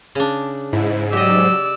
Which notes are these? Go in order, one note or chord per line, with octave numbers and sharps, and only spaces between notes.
C#3 D4
G#2 E4
F#3 G4 D5 D#5 E6